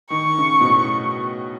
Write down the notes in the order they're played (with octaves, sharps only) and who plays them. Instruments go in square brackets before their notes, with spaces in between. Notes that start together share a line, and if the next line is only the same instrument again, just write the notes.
[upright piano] D#3 [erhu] C#6
[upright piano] C#3
B2
A2